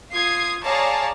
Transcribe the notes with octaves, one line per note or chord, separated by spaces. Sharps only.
F4 D#6 G#6 C7
G#4 C#5 D5 F5 A5 A#5